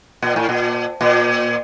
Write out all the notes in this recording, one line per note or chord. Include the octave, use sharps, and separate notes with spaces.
A#2
A2
A#2
A#2